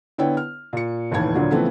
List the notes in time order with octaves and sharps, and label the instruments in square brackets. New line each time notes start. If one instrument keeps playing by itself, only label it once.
[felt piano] D3 B3 E4 C#5 G5
F6
A#2 C#7
F1 D#2 A2 E3 A5 G#6
D2 A#2 D3 F#3
C#3 E3 F3 A3 B3 C4